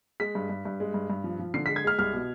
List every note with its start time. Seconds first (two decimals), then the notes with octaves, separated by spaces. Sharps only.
0.20 G#3 B6
0.35 G2
0.50 G2
0.65 G2
0.80 G#3
0.94 G2
1.10 G2
1.24 F3
1.39 F3
1.54 D3 C7
1.66 B6
1.69 G#3
1.76 G#6
1.84 G#3 F6
1.99 C2 F6
2.13 B2